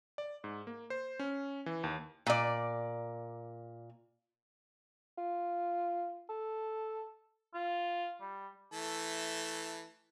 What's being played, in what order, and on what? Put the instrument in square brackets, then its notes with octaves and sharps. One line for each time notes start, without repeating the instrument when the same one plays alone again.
[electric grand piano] D5
G#2
A#3
C5
C#4
E3
D#2
[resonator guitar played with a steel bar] A#2 D5
[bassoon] F4
A4
[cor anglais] F4
G3
[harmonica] E3 A3 A4